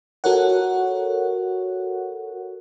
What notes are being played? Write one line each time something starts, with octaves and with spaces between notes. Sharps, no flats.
F#4 A4 A#4 C#5 F#5